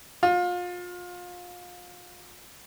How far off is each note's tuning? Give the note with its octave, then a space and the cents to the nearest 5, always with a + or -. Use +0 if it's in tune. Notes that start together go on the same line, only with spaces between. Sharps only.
F4 +30